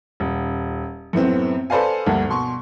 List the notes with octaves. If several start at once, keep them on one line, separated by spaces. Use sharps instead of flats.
D#1
F#2 A2 B3 C4
A4 B4 C5 D5 F5 G#5
D2 G2 A#3
B2 C6 C#6